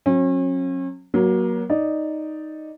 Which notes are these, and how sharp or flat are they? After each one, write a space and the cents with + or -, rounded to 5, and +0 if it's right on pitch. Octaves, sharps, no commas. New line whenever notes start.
F#3 -30 C#4 -40
F#3 +5 A#3 +25
D#4 +0 D5 +0